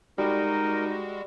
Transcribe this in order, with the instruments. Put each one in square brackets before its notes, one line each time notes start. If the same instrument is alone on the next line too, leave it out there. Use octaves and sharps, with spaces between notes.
[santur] G3 [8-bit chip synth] G#3 F#4 [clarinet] D#4 [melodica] A#4